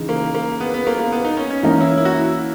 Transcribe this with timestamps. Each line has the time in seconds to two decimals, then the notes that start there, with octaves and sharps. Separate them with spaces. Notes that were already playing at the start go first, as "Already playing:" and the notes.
Already playing: C#3 E3 G#3 D#4
0.09 A#3
0.35 A#3
0.61 B3
0.74 B3
0.87 A#3
0.99 A#3
1.12 B3
1.25 D#4
1.37 C#4
1.51 C#4
1.63 E3 A#3 C#4 D#4
1.80 E4
1.97 E4
2.05 F#4
2.14 E4